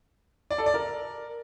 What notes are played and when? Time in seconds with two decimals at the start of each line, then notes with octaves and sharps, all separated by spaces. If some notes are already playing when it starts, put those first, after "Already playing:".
0.51 D5
0.58 A4
0.66 D5
0.74 A#4